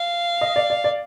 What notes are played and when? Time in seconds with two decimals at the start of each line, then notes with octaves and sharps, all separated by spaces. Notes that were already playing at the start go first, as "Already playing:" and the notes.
Already playing: F5
0.41 D#5
0.56 D5
0.70 D5
0.84 D5